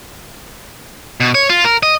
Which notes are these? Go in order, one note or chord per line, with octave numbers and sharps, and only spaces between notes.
B2
C#5
F4
A#4
D#5